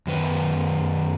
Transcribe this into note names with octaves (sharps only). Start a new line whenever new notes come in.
F#2 D#3 B4